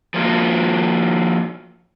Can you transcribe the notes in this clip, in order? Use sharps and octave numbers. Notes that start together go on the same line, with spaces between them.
F3 A#3 F4 F#4